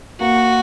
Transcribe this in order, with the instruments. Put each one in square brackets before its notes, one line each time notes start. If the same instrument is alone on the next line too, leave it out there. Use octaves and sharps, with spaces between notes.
[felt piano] A#3 [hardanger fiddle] F#4